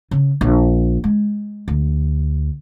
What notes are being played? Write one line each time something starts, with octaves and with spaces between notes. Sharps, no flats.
C#3
A#1
G#3
D2